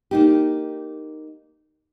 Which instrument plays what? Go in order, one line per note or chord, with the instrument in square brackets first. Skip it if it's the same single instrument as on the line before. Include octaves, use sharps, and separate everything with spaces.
[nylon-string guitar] A#3 D#4 G4